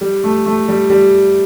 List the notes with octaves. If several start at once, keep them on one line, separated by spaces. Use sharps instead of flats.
G3
A3
A3
G3
G3